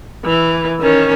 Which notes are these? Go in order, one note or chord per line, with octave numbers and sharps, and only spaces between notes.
E3
D#3 C#4